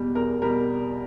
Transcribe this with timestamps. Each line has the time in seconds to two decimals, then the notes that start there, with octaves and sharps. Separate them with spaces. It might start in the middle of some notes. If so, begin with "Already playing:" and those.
Already playing: E2 B2 G3
0.15 E2 A#4
0.42 B2 G3 A#4